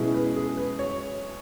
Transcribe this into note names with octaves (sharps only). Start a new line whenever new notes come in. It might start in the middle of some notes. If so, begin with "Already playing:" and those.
Already playing: B2 G#3 C#4 E4 G#4
B4
G#4
B4
C#5